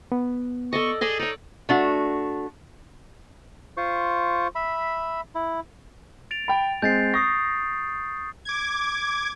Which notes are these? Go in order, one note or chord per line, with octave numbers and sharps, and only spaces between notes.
B3
A4 D5 D#5 C#6
G#4 A4 D5 D#5
D#4 C#5 D5
A3 D4 F#4
F4 C5 C#6
E5 B5
E4
A6 D7 F7
G5 B5
G#3 C4 G6 A6 C7
C#6 D#6 A#6 C7
D6 G#6